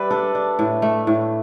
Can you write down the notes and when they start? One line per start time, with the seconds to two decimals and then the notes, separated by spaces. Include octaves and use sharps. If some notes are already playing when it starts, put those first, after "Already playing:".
Already playing: G3 B4 D5 E5
0.10 D4 A4
0.35 D4
0.59 A2
0.82 A3
1.07 A2